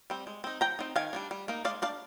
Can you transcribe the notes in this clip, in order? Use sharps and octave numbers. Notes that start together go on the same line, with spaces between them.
G3 C4
G#3
C4 D#4
F3 G5 A#5
C4 D#4
D#3 F5 G#5
G3 A#3 D4
G3
A#3 D#4
G#3 D5 F5
D4 D5 F5